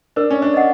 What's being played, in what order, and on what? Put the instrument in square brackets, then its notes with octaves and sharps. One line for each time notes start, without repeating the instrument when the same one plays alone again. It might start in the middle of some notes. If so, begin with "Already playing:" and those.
[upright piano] D4 [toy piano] A#4
[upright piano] C#4
D4
[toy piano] D#5 F#5